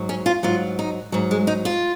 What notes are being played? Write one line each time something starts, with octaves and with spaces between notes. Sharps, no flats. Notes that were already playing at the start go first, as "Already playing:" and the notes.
Already playing: G#2 F#3
C#4
F4
G#2 F#3 F4
D#4
G#2 F#3
G#3
D#4
F4